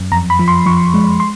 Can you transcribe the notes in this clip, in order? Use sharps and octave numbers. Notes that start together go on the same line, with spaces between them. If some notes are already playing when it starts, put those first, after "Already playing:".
Already playing: F#2
F2 A#5
B5
F3
C6
F3 C#6
G#3
C6